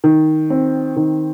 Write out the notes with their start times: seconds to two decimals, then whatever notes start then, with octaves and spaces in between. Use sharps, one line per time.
0.04 D#3
0.50 C4
0.97 D#3